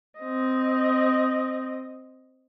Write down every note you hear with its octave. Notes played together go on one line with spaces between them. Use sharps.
C4 D#5